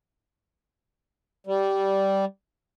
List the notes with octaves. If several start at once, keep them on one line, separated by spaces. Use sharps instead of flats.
G3